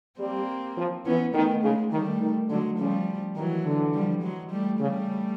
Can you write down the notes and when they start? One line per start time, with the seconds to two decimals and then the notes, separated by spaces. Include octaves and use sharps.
0.19 G3 A#3 C4
0.77 F3
1.05 E3 B3 C#4
1.34 D#3 A3 B3
1.63 C#3 G#3 A#3
1.92 D#3 G3 A3
2.21 D#3
2.49 D3 F#3 G#3
2.78 C#3 F3 G3
3.36 D#3 E3 F#3
3.65 D3
3.93 F3 G3
4.22 F#3 G#3
4.51 G3 A3
4.80 C#3 G3 A3